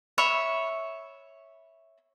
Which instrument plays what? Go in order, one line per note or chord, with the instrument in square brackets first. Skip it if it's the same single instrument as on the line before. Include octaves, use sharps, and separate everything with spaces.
[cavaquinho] C#5 E5 B5